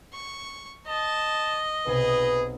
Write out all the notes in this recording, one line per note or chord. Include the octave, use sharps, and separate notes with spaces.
C#6
D#5 A5
B1 C3 G#4 B4 A6